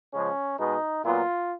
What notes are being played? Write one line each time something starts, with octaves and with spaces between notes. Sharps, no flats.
C#3 F3 G#3 C#4
B2 G#3 B3 D#4
A#2 F#3 B3 F4